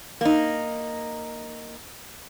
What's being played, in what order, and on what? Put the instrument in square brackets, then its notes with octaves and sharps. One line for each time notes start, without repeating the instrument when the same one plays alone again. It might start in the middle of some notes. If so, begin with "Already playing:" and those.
[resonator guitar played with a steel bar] A#3 D#4